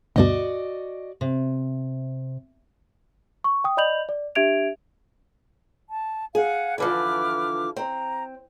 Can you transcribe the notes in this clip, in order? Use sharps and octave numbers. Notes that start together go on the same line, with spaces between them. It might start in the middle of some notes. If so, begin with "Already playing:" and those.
D2 G2 B2 F#4 D5 D#5
C3
C#6
G5 D#6
D5 D#5 B5 G6 F7 F#7
D5
D4 G4 E5 G#6 D7 F7
A5
G#4 F5 F#5
D3 E3 F3 B4 D6 F6
C4 A#5